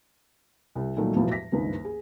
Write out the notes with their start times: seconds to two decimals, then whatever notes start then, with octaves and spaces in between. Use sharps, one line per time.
0.75 C2
0.97 A#2 D#3 F#3 G3 A3
1.16 E1 E2 A2 F3 F#3 E4
1.32 A#6 B6
1.52 F#1 C#2 G2 D#3
1.85 G#4